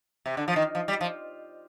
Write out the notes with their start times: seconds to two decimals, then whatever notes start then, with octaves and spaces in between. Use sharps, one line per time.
0.26 C3
0.37 D3
0.48 F3
0.56 D#3
0.75 F3
0.88 G3
1.01 F3